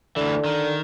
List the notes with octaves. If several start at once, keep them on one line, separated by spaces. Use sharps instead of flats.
D2 D3 E3
D#3